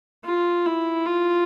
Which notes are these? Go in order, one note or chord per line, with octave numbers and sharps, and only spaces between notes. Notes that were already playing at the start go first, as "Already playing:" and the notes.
F4
E4
F4